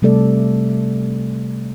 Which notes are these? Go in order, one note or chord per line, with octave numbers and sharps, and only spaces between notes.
C3 G3 A3 A4 D5